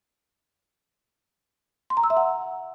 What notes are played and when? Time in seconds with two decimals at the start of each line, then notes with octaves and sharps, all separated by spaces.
1.90 C6
1.97 A#5
2.04 E6
2.10 E5
2.17 F#5